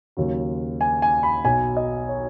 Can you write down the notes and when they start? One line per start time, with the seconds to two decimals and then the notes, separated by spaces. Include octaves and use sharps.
0.17 D#2 C#3 F#3
0.81 G#5
1.02 G#5
1.23 B5
1.44 B1 B2 F#3 G#5
1.77 D#5
2.09 C#5